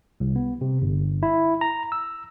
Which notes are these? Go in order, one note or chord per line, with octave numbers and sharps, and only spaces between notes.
C2
B3
C3
G1
E4
A#5
E6